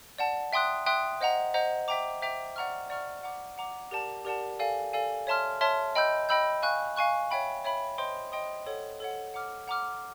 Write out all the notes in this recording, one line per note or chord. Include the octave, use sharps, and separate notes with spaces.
D5 F#5 A5
E5 G5 C6 D#6 F#6
E5 G5 C6 D#6 F#6
C5 D#5 F#5 A#5
C5 D#5 F#5 A#5
C5 E5 G5 A#5 D6
C5 E5 G5 A#5 D6
D5 F#5 A#5 C#6 F6
D5 F#5 A#5 C#6 F6
F#5 A#5 D6
F#5 A#5 D6
G4 A#4 D5 F#5 A5
G4 A#4 D5 F#5 A5
A4 D5 F5 G#5
A4 D5 F5 G#5
C#5 E5 A5 C6 F6
C#5 E5 A5 C6 F6
D#5 G5 B5 E6 G6
D#5 G5 B5 E6 G6
F5 G#5 C#6 F#6
F5 G#5 C#6 F#6
C#5 E5 G5 B5
C#5 E5 G5 B5
C5 D#5 G5 C6 D#6
C5 D#5 G5 C6 D#6
A4 C#5 F#5
A4 C#5 F#5
F#5 A#5 D6 F6
F#5 A#5 D6 F6